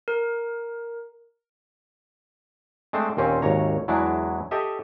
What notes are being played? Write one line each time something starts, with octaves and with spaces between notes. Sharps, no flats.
A#4
G#3 A3 C4 D4 C5
D#2 A#2 C4 C#4
G#1 D#2 C#5 A#5
E2 F#3 G#3 D4 E4
G4 A4 D#5 E5